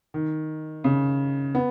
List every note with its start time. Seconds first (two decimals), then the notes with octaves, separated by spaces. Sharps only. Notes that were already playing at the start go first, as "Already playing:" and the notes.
0.14 D#3
0.84 C#3
1.55 B3